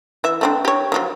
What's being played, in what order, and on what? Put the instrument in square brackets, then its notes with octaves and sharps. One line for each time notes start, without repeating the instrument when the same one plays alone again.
[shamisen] E3 E5
A3 C4 D4
G4 C#5
D#3 F3 F#3